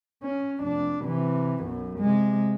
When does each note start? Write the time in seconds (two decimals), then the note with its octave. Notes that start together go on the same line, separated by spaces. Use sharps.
0.23 C#4
0.60 F1 D4
1.03 C3 E3
1.63 B1 F#2
1.99 C3 G#3